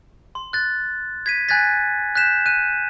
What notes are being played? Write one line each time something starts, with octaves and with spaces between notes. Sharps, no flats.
C6
F#6 A6
G#6 B6 D#7
G#5 F#6 G#6 A6 B6
F#6 G6 B6 E7
F#6 D#7